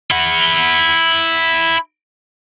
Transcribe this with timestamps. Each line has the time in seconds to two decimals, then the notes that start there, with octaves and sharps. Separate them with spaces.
0.11 E4 F#5